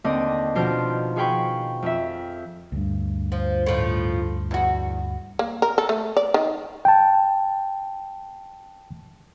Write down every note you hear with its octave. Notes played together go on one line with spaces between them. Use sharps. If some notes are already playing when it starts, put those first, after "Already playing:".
D#2 D3 C4 D#5 D#6
B2 D#3 F3 D4 C5 F6
F#4 G#4 F5 G5 B5 C#6
F2 E5
D2 G2
F3
A2 F3
E2 F#4
A#3
A#4
A4
A3
D5
D#3
G5 A5